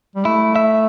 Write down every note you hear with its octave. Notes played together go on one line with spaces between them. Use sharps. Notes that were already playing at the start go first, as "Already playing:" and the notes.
G3
A3 E4
E5